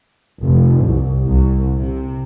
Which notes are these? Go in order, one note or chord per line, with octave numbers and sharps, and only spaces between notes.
F1
C2
C2
C3